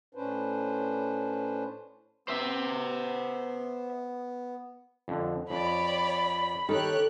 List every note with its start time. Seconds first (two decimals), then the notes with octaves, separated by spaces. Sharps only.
0.15 A2 C#4 D4 B4 C5
2.28 B3 C5 E5
5.08 F2 D3
5.50 F2 C#5 D5 B5
6.69 D#3 G4 A4 C#5 F#6